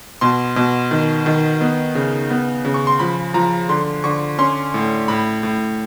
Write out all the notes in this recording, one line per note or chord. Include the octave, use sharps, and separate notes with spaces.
B2 C6
B2
D#3
D#3
B3
C#3
B3
C#3
C#6
C6
F3 B5
F3 A#5
D3 C6
D3 C#6
C#4 C6
A2
A2 B5
A2